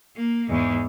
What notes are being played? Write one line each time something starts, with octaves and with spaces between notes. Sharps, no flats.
A#3
E2 G#2